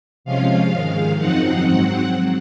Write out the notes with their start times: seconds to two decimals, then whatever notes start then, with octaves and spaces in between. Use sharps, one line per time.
0.25 C3 F3 G#3 C#4 F4 F5
0.72 G#2 D#3 G#3
1.18 F#2 F3 C4 D#4 F#5
1.66 G#2 F#3 C4